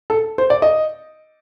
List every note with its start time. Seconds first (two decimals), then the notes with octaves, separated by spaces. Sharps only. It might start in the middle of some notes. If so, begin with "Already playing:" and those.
0.10 A4
0.38 C5
0.50 D5
0.62 D#5